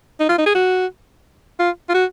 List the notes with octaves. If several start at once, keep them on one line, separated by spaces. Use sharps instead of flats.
D#4
F4
D#4
G#4
F#4
F4
F4
F#4